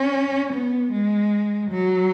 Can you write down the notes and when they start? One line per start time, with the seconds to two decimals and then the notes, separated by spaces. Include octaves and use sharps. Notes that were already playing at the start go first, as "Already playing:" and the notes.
Already playing: C#4
0.53 B3
0.92 G#3
1.71 F#3